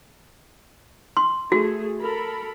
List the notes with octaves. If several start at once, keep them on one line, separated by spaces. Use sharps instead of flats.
C6
A3 F#4 G#4
A4 A#4 B5